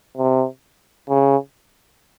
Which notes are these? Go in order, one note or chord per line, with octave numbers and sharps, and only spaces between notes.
C3
C#3